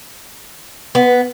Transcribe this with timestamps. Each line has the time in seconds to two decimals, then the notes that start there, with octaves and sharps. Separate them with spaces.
0.95 B3